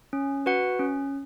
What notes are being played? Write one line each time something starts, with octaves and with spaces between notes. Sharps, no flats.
C#4
F#4 B4 F#5
C#4